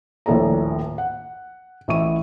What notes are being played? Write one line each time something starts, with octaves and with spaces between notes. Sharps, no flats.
D#1 A#1 A2 A4 D5 A#5
F#5
A1 E4 E5 C#6 D#7